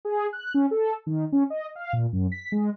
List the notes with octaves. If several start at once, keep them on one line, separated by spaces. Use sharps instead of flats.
G#4
F#6
C#4
A4
D#3
C#4
D#5
F5
A#2
F#2
B6
G#3